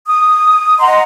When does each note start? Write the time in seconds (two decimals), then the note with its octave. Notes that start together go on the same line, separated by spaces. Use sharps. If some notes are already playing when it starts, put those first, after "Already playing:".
0.07 D#6
0.79 D#5 F#5 A#5 C6